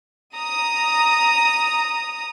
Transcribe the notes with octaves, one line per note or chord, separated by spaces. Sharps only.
A#5 D#6